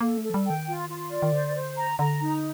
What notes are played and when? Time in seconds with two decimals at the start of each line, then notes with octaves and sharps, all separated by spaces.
0.01 A#3 A4
0.18 A3
0.23 A4
0.30 F3
0.34 G3
0.45 D#3 G5
0.68 F4
0.89 F4
1.10 D5
1.22 D#3
1.32 D3 C5
1.55 C5
1.76 A#5
1.99 D3 A#5
2.20 D#4